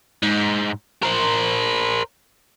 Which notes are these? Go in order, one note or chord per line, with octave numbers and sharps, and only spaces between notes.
G#2
A#4 C5